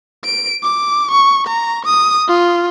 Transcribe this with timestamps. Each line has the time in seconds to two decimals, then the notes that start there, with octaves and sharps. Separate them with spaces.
0.24 D7
0.63 D6
1.11 C#6
1.47 A#5
1.85 D#6
2.28 F4